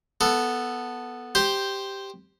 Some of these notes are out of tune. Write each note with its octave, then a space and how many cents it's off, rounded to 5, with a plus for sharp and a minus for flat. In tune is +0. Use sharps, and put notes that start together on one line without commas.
B3 -5 A4 +0
G4 +0 C5 +0